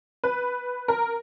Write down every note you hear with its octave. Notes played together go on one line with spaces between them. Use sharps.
B4
A#4